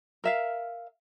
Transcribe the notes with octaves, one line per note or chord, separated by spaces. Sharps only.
A#4 E5 F5